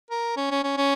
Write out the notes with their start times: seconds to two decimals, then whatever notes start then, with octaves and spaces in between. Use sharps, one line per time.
0.10 A#4
0.37 C#4
0.51 C#4
0.64 C#4
0.78 C#4